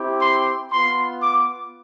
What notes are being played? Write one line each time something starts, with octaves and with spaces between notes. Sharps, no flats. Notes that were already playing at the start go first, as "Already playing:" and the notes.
Already playing: C4 E4 G4
C6
B3 F4 C6
D6